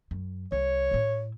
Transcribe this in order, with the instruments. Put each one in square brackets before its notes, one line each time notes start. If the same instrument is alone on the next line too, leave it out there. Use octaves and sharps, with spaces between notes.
[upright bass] F#2
[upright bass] C2 [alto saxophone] C#5
[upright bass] A2 E4